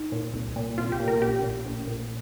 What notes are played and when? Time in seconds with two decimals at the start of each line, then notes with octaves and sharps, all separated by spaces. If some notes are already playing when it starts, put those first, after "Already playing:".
Already playing: D#4
0.12 A#2
0.34 C2
0.56 A#2
0.78 C2 F4
0.92 G4
1.00 A#2
1.08 A#4
1.21 A#1 G4
1.43 A#2
1.66 A#1
1.87 A#2